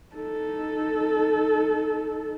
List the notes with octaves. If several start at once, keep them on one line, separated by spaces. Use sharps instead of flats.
D#4 A4